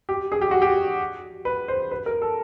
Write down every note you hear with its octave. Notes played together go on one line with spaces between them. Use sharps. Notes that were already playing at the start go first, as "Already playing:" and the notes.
G4
G#4
G4
F#4
G4
B4
C5
B4
A#4
A4